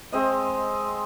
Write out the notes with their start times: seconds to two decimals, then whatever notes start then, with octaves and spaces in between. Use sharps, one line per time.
0.12 G#3 C4 D#5